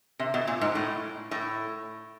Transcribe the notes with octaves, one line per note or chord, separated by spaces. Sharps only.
C3
B2
A#2
G#2
A2
A2